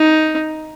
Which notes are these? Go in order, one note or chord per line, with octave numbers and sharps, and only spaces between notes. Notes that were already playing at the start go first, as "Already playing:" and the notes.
Already playing: D#4